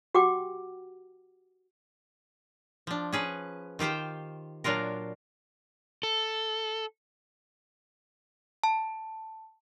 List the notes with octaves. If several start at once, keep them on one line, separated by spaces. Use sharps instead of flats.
F#4 G4 F#5 G5 D6
F3 D4
C#4 G#4 B4
D#3 F4 G4 C5 G5
A#2 F#3 D4 F4 A#4
A4
A5